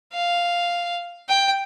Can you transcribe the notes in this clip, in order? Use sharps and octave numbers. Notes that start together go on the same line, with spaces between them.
F5
G5